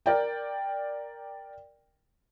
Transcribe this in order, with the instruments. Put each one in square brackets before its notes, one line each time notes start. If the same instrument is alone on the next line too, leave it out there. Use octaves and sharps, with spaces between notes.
[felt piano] A#4 D5 G5